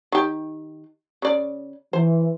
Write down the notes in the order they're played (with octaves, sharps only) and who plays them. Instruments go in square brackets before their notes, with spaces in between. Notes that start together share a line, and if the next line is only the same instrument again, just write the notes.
[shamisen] D#3 G4
C#3 D5
[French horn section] E3 [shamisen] C5